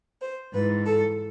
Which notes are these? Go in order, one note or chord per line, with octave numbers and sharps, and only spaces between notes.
C5
G#2 E3 B4
A4